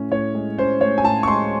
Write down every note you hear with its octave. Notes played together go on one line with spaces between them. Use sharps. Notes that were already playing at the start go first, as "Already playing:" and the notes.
Already playing: A2 C#4
A2 C#5
G#3
C#4 C5
A2 C#5
G#5
A2 A5
C#6
G#3 C6